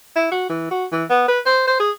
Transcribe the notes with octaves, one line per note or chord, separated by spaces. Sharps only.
E4
F#4
E3
F#4
E3
B3
B4
C5
C5
G#4